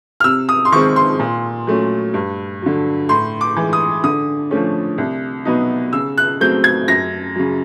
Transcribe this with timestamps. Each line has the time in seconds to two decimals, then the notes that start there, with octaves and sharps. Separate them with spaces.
0.20 F6
0.24 C3 E6
0.49 D#6
0.65 C6
0.72 D#3 G#3 C4 C#6
0.96 C6
1.19 A#2
1.67 F#3 A3 C#4
2.14 G2
2.62 D3 F#3
3.09 A2 C6
3.41 D6
3.56 E3 G#3
3.73 D#6
4.04 D3 D#6
4.51 F3 A3 C#4
4.98 C2
5.45 B2 F#3 B3 D#4
5.93 C#3 E6
6.18 F#6
6.40 F#3 A3 C4 G6
6.64 G#6
6.88 F#2 A#6
7.35 C#3 F#3